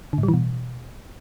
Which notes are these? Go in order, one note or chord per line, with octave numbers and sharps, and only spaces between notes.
D3
A2
G3
E3
B2